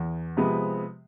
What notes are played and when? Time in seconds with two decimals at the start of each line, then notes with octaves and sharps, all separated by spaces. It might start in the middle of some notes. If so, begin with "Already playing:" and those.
Already playing: E2
0.37 C3 F3 G#3 B3